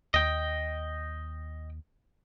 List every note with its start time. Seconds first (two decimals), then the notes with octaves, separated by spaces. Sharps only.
0.14 D#2 D#5 G5